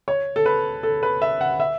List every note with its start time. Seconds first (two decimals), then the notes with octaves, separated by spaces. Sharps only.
0.08 C#5
0.36 A4
0.46 B4
0.83 A4
1.03 B4
1.22 E5
1.41 F#5
1.60 E5